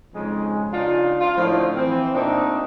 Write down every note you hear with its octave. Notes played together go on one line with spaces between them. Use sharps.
F2 G#2 C#3 G#3
C#3 D4 D#4 F4
F4
A2 D3 D#3 F3
E3 C4
A#2 A3 A#3 C4 D4 D#4